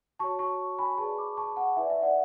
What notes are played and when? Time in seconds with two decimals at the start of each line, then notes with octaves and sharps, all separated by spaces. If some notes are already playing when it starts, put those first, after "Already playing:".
0.19 F#4 C#5 A5 C#6
0.39 A5 C#6
0.79 G#5 B5
0.97 G#4 B4 D5 A5 C#6
1.18 B5 D6
1.37 A5 C#6
1.56 F#5 A5
1.76 E4 B4 D5 E5 G#5
1.90 E5
2.02 D5 F#5